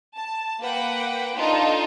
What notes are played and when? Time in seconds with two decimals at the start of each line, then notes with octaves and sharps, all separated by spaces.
0.16 A5
0.60 A#3 B4 F#5 G5
1.36 D4 D#4 F4 A4